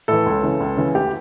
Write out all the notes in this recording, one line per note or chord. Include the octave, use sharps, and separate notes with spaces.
A2 E3 A4
C#2
C#3 E3
C#2
C#3 E3
D2 G4